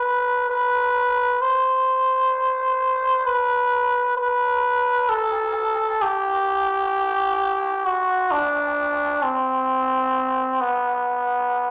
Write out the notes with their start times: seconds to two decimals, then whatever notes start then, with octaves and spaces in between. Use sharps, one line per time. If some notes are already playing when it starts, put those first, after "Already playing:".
Already playing: B4
0.50 B4
1.42 C5
3.26 B4
4.17 B4
5.09 A4
6.02 G4
7.85 F#4
8.31 D4
9.23 C4
10.61 B3